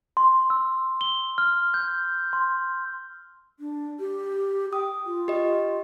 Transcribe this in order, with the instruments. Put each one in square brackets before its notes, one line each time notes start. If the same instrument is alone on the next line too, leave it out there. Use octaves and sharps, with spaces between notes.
[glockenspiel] C6
E6
G7
F6
G6
C6
[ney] D4
G4
[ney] G5 [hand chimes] D#6
[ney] F4
[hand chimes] G4 D#5